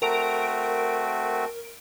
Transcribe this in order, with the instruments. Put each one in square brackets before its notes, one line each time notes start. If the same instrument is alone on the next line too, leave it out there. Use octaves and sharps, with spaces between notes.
[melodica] A3 C4 F#4 [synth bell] A#4 D7